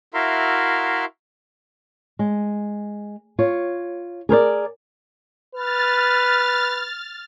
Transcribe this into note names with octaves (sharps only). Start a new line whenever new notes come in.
E4 F#4 A#4 E5 F5 C6
G#3
F4 C#5
G#4 A#4 C5 D5
B4 F6 A6